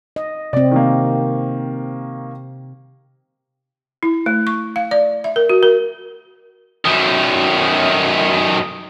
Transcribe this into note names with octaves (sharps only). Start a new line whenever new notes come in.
D#5
C3 C4 D5
D#3 A#3
E4
A3
C#6
F5
D5
E5
A#4
F#4
A#4
F#2 D#3